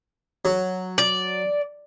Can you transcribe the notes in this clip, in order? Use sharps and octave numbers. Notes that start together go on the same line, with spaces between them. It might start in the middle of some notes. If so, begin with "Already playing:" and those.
F#3
D5